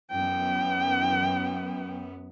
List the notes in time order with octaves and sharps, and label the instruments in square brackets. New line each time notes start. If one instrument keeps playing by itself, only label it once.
[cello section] F#2 B3 [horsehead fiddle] G5